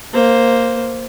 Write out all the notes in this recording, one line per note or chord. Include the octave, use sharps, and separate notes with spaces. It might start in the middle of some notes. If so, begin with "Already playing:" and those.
A#3 C5